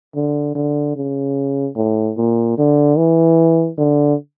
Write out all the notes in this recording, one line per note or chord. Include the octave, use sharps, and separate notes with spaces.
D3
D3
C#3
A2
A#2
D3
E3
D3